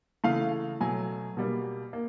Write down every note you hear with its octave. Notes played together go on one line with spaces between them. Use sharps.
C#3 E3 A3 F5
B2 F#3 A3 G#5
B2 G3 A#3
A#3